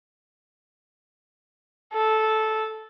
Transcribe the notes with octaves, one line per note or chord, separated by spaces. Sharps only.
A4